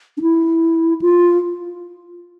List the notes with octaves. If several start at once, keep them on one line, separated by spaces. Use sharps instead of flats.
D4
E4
F4